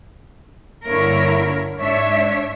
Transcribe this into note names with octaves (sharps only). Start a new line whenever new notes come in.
G2 D3 A#3 E4 A#4 C#5
G#2 D4 C#5 E5